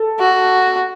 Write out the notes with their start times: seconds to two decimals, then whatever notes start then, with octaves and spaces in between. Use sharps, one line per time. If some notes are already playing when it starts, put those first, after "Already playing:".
Already playing: A4
0.20 F#4